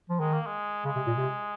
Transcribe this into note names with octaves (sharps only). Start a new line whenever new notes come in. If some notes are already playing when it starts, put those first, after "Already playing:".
F3
D#3 G#3
A#3
G#3
C#3 G#3
C3
A#2
C3